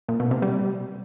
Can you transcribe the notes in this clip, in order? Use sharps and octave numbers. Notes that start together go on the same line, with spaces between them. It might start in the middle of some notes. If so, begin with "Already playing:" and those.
A#2
B2
C3
G3